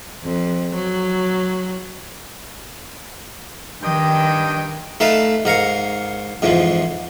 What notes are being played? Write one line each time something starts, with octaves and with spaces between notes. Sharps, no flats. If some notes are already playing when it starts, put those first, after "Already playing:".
F2
F#3
G2 D#3 D#5 G5
A3 D#4 B4 F5 A5
G#2 A#4 F5 C#6
F2 G#2 E3 F3